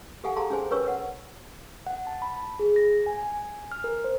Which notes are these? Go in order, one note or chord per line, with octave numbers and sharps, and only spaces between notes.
G4 A4 F5 F#5 G#5
G#4 A4 F5 A5 A#5 C6
C#4 G#4 C5 G#5
C#4 A#4 B4 C#5 C#6 E6
F#5
F#5
A5
B5
G#4
A#6
G#5
G#5
F6
A#4
C5